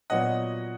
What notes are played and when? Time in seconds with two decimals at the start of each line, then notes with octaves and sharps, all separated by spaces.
0.10 A#2 F#3 B3 F#4 C#5 D#5 F#5